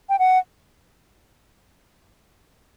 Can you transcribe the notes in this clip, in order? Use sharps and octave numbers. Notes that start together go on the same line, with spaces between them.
G5
F#5